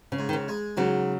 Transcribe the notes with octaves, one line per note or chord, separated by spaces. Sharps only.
C#3
G#2
D#3
C#3
G#3
G#2 C#3 F#3